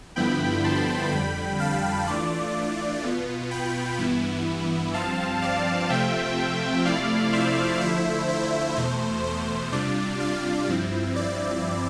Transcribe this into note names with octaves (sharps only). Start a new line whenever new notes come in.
G2 D3 F3 B3 E4 G5 B5
A5 C6
F2 D3 G3 G5 B5
F5 A5
E3 A3 D4 F4 D5
B2 B3 F4
G5 B5
G2 E3 B3 E4
G2 F3 C4 F5 A5
D5 F5
C3 F3 A3 C4 F4 E5 G5
C3 F3 A3 E4 D5 F5
C5 E5
D3 F3 A3 E4 C5 E5
C5
E2 B2 A3 C5
C5
C3 G3 D4 F4 D5
D5 F5
G2 F3 C4 E4
D5